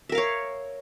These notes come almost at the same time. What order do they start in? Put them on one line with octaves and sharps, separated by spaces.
E5 A#4 F5 C#5